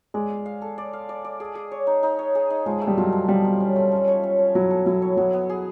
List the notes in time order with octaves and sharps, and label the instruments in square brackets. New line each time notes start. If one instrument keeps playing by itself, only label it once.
[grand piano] G#3 [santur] D5
[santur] F5
F5
A4
D5
F5
D5
D5
G#4
G#4
C#5
D#4
D#4
C#5
G#4
D#4
[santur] F3 [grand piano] G#3
[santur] A3
[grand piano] G3
[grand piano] F#3 [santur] F4
[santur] F3
[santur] F3 [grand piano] G3
[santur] F3
C#4
A3
C#4
C#5
C#4
C#5
[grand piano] F#3 [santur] E4
[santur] A4
[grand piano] F#3 [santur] E4
[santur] C#5
[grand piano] F#3 [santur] B3
[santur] B3
G#4